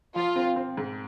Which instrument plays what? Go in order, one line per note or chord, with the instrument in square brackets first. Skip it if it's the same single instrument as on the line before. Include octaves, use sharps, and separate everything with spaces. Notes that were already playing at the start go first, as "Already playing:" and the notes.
[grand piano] F3 [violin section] F4
[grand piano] C4
C4
G#2